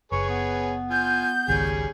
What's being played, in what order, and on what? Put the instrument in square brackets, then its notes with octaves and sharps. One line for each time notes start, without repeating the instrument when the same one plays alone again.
[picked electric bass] F#1 [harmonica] G#4 B4 C#5 [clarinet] C#6
[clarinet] B3
[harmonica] F4 G#5 [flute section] G6
[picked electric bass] G#1 C#2 D#3 [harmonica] G3 C#4 G#4